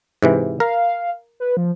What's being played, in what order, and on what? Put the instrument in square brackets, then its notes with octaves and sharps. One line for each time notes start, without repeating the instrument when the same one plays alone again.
[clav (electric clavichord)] G#2 C3 E3
[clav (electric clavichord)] A#4 [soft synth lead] F5
[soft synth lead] B4
F3